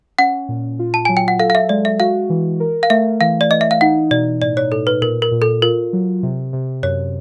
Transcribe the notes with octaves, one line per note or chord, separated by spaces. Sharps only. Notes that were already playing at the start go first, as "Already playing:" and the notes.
C#4 F#5
A#2
F4
A5
F#3 G#5
G5
F#5
A4 F5
F5
E5
G#3 D5
E5
F#4 F5
E3
A#4
F5
A3 E5
E3 F5
D5
E3 D#5
E5
F5
D#4 F#5
B2 D5
A2 D5
C#5
A2 A4
B4
A#2 A#4
A#4
A#2
A4
F4 A#4
F#3
C3
C3
F#2 C#5